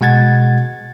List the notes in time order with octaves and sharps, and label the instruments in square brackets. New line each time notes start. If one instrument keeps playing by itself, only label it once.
[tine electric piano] B2 G#3 F#5 G#6 A6